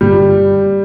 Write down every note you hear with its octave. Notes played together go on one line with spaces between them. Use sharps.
G2 D3 G3 C4